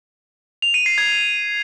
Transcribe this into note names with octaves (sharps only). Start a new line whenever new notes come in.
F7
D#7
C7
G#6